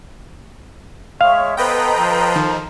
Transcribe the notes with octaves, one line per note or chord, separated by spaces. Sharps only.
G#3 C#5 E5 F5 C#6
B3 A4 B4 C5 D#5 G5 A#5
F3
D#3